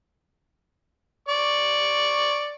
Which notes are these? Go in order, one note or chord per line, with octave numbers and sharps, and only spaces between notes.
D5 C#6